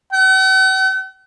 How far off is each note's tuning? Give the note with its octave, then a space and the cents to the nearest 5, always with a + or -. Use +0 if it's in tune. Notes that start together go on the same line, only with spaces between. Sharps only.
F#5 +45